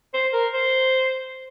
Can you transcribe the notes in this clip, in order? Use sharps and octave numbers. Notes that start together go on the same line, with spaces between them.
C5
A#4
C5